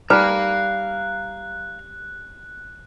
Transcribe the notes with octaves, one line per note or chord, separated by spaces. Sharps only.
G3 D#4 B4 D5 F5 A#5 F#6